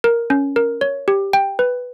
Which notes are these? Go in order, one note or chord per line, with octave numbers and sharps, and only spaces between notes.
A#4
C#4
A#4
C#5
G4
G5
B4